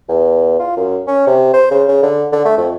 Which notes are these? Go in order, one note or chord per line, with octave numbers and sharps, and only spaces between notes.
E2
F4
F#2
C#4
C3
C5
C#3
C#3
D3
D3
A3
F2